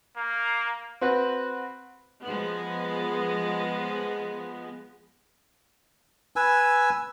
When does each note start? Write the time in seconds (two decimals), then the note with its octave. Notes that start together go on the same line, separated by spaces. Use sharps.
0.17 A#3
1.01 C4 F#4 B4
2.23 F3 G#3 B3
6.36 B4 G#5 E6